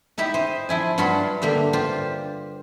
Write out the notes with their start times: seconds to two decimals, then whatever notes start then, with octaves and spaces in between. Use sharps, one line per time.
0.18 D#4 E4 G4 E5
0.34 C5 D#5
0.69 F3 E4 G#5
0.98 G2 F#3 F4 A5 B5
1.42 D3 A#3 G4 E5
1.73 F4 G4 C5